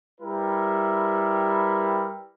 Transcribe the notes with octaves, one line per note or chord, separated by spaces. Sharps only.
G3 E4 A#4 B4